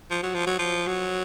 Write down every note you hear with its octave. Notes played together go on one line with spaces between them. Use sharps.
F3
F#3
F3
F#3
F3
F#3